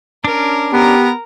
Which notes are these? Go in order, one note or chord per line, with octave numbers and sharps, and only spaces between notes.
C#4 D4 A#4
B3 G4 A#4 A#5